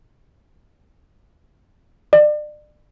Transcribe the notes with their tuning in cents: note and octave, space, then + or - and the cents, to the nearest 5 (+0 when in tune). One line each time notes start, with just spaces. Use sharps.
D5 +35